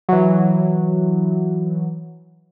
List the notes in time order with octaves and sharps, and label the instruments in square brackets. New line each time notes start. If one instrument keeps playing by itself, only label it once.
[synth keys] E3 F#3